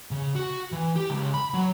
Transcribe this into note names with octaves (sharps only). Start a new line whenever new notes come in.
C#3
F#4
E3
G4
C#2
B5
F#3